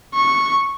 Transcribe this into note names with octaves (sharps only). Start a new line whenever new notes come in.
C#6